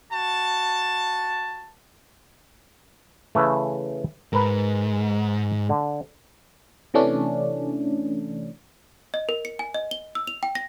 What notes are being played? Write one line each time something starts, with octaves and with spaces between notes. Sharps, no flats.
F#4 A5
C#3 E3 A3
G#2 A#4 B4
D3
C3 E3 A3 C#4 D4
D#5
A#4
C#7
G#5
D#5
G7
E6
F7
G5
A#6